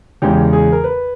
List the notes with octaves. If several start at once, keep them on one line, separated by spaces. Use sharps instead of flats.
E2 C#3 G#3 C#4 G4
G#4
A#4
B4